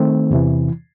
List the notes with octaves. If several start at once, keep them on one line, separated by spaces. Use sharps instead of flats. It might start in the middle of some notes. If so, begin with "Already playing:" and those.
Already playing: D#3 A3 C4
E2 C3 E3